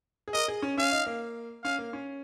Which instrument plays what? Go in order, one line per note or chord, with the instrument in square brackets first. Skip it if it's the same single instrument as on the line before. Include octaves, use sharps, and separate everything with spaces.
[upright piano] G#4
[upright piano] A#4 [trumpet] D#5
[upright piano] G#4
C#4
[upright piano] C#4 [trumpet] F5
[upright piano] D#4
A#3
[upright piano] C#4 [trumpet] F5
[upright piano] A#3
C#4